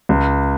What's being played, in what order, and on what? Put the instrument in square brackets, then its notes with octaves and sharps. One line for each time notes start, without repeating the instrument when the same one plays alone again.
[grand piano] C#2